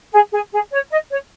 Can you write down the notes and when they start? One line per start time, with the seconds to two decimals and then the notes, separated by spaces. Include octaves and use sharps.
0.13 G#4
0.32 G#4
0.52 G#4
0.72 C#5
0.91 D#5
1.11 C#5